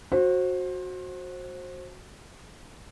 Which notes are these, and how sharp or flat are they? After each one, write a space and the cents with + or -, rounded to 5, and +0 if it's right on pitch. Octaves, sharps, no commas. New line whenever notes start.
F#4 -10 C5 +25